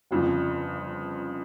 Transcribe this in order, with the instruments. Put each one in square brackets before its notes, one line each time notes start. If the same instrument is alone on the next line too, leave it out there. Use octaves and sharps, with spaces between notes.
[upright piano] G1 F2 C#3 F3